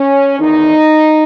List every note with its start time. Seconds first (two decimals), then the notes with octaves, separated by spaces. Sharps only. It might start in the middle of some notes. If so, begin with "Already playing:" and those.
Already playing: C#4
0.38 E2 D#3 D#4